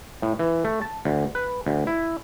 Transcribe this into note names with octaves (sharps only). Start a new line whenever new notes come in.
A2
E3
A3
A5
D2
B4
D2
E4